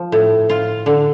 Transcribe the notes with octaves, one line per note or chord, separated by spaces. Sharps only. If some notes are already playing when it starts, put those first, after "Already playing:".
Already playing: F3
A2
F4
D3